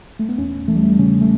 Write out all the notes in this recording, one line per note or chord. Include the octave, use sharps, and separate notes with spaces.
A3
B3
E2 C#4
E3 A3
G3
A3
C#3 C#4
A3